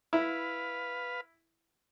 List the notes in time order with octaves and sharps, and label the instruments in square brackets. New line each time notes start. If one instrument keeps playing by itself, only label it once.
[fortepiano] E4 [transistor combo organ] B4 F5